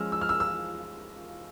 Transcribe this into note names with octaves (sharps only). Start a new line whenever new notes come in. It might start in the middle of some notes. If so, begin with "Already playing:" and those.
Already playing: F3 G#3 C#4 E6 F6
E6
F6
E6
E6